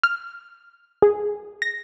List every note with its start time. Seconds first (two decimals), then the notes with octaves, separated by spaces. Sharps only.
0.03 F6
1.02 G#4
1.62 A#6